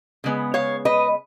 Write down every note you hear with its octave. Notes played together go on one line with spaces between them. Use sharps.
C#3 G#3 B3
C#5 F5
B4 D#5